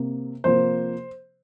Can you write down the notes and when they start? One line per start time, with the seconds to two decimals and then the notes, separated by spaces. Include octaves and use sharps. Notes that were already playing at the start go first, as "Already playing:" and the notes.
Already playing: C3 A#3
0.44 C3 F3 A#3 C5